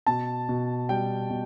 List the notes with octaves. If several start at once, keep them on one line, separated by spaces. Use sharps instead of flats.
B2 A5
B2
G3 G5
B2